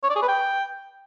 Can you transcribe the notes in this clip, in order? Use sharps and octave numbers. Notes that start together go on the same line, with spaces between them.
C#5
D5
G#4
B4
G5